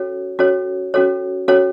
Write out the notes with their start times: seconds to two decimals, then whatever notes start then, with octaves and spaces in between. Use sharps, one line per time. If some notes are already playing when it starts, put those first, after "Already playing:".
Already playing: C#4 F#4 A4 C#5
0.39 C#4 F#4 A4 C#5
0.94 C#4 F#4 A4 C#5
1.48 C#4 F#4 A4 C#5